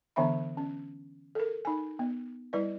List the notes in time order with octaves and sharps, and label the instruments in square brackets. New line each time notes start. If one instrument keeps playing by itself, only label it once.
[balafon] D3 E3 B3 D4 E5 B5
C#4
A4 A#4
D#4 G#5
B3
G3 E4 B4 D5